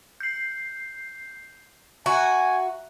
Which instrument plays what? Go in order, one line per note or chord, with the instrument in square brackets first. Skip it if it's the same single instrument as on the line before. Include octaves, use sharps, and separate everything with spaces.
[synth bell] G6 C7
[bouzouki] F#4 [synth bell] E5 [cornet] G#5